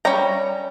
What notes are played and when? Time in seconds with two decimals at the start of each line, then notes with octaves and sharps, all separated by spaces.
0.05 G3 C#4 A#5